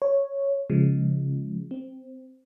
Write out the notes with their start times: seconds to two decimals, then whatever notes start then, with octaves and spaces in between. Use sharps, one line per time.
0.02 C#5
0.70 C#3 F3 G#3
1.71 C4